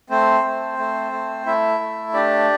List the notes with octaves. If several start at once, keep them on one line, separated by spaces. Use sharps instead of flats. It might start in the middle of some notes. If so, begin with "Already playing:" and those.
A3 C4 C5
A3
A3
A3
A3 E4 E5
A3
D4 G4 D5